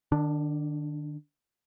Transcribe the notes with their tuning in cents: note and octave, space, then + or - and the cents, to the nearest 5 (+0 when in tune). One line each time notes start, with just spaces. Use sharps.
D#3 -45 D4 +0